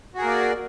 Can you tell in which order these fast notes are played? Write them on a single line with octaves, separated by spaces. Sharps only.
F#4 G#4 A#4 A#3 D5